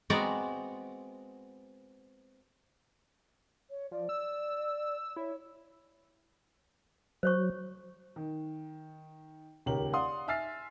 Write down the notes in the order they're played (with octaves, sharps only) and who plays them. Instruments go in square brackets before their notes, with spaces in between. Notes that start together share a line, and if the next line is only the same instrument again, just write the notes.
[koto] G#3 B3 C4 F#4 D5 A#5
[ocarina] C#5
[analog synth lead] F3 [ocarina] D5
[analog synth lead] E6
[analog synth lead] E4 [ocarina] C#5
[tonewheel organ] F#3 [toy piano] C5 C#5 C#6
[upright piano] D#3
D#1 C#2 G4 A#4 C#5 F#7
D5 F5 F#5 C6 D#6
E5 G#5 E6 F6 A6 C7